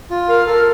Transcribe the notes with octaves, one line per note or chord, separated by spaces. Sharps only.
F4
A#4 F5
A4 A#4